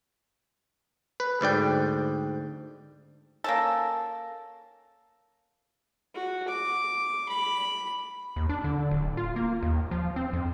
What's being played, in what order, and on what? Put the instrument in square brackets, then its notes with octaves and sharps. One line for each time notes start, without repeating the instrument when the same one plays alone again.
[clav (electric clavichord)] B4
D2 G#2 D5 G5
[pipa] A#3 C#4 A4
[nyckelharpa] F#4
D6
B5
[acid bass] D#2
D4
D3
D1
F4
A#3
D#2
F3
C4
F2